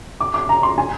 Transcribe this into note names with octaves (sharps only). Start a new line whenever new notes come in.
D6
D6
A#5
C6
G#5